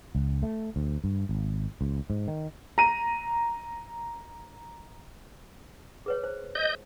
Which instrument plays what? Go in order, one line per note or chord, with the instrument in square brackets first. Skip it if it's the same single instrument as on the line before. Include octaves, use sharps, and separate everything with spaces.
[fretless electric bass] C#2
A3
D2
G2
G#1
C#2
G#2
D#3
[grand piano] A#5 D#7
[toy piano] G#4 B4 C#5
C5
[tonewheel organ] D#5 G6